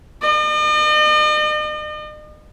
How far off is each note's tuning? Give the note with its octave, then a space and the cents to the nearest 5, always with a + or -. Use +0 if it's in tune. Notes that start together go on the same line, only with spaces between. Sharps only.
D#5 -45